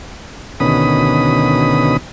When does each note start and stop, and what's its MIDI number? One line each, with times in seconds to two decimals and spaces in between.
0.60 1.97 38
0.60 1.97 47
0.60 1.97 51
0.60 1.97 61
0.60 1.97 83
0.60 1.97 87